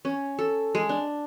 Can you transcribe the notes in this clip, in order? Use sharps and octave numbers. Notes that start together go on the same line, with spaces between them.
C#4
A4
G#3
D4